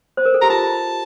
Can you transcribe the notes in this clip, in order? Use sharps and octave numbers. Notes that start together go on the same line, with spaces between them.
C5
A#4
A4
G4 A#5
F4 A5